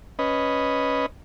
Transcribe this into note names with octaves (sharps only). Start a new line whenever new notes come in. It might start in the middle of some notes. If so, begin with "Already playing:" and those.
C#4 B4 D#5